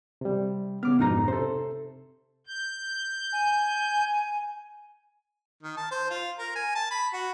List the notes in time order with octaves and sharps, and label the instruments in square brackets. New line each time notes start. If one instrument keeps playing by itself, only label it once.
[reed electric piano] C3 G3
[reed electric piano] C#3 D6 F6 [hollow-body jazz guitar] B3
[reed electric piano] F2 G#2 B2 [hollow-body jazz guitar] D4 D#4 A#5
[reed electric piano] C3 A4 [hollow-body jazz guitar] C5
[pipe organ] G6
[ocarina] G#5
[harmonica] D#3
A5
C5
F4
A#4
G#5
A5
B5
F#4